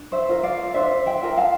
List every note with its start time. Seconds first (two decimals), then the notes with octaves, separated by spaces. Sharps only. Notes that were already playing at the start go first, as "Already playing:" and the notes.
Already playing: D4
0.12 C5 E5
0.28 F4 A#4
0.43 D5 F5
0.74 D4 C5 E5
1.06 E5 G5
1.22 F4 A#4
1.37 F5 A5